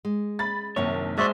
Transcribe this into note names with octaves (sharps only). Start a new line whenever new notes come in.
G#3
B5 A6
A#1 F#2 C3 D#3 C#5
G#3 F#4 C5 D5 E5